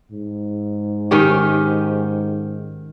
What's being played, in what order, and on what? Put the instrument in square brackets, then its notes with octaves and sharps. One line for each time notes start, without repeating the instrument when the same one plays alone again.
[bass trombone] G#2
[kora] D#3 C#4 G4